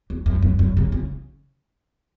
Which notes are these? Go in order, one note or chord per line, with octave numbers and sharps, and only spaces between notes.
E2
F#2
F#2
F#2
C#3
C#3